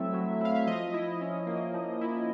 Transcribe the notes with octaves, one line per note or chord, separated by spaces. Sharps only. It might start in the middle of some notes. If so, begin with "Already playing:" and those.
Already playing: F#3 A3 C4 E4 E5
F#3
E4 F5
E5
F3 D#5
E4
C#4
A#3
F3
E4